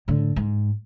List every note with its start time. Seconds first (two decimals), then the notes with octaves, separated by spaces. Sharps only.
0.08 A2 D3
0.36 G#2